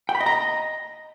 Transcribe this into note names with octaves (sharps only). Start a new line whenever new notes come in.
G5
B5
D#5
A#5
D#5